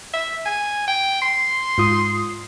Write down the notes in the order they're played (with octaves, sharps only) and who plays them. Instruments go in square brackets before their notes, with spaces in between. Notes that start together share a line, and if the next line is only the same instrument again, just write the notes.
[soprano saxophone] E5
G#5
G5
C6
[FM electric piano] G#2 F4 D#6